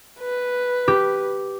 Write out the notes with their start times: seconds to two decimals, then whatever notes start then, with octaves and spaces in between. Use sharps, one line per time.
0.20 B4
0.88 G4